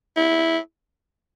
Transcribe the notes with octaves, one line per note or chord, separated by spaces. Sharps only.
E4